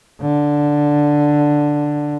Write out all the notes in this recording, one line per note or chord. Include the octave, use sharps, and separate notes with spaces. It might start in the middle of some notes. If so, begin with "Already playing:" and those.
D3